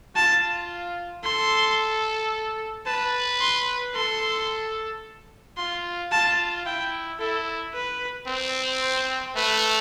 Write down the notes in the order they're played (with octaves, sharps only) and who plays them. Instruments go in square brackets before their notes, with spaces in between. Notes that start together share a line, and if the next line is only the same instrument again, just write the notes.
[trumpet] F4 [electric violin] A5
[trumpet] A4 [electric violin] C6
[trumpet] B4 [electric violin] A5
[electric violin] C6
[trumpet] A4 [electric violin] C6
[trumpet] F4 [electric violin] C6
[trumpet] F4 [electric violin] A5
[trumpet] E4 [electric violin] G5
[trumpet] E4 [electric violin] A4
[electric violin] B4
[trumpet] C4
[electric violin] C5
[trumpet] A3 [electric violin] B4